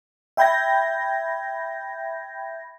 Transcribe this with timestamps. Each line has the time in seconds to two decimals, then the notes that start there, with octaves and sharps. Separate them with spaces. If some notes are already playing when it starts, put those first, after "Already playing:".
0.37 E5 G5 B5 G6 G#6 A#6